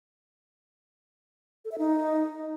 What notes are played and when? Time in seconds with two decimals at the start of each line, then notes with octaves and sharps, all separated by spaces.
1.65 A4
1.72 E5
1.78 D#4